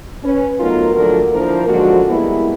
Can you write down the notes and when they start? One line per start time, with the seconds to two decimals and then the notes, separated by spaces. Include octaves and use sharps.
0.24 C#4 B4
0.60 F#3 A3 B3 D#4 F4 A#4
0.96 A#2 D3 F3 F#3 A3 A#4
1.34 F3 A#3 D4 E4 A#4 C5
1.68 F#2 D3 F3 G#3 F#4
2.09 G3 G#3 A#3 B3 E4